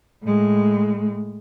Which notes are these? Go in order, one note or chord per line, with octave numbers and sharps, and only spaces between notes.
A2 G#3